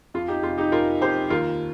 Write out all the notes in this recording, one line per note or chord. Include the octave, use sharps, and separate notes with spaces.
F2 F4
D#4 G4
F1 F4
D#4 G4
F1 F4 A#4
F2 G4 C5
D#2 F4 A#4